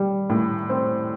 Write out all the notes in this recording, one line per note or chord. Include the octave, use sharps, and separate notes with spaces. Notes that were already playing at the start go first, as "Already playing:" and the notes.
Already playing: G3
A2
C4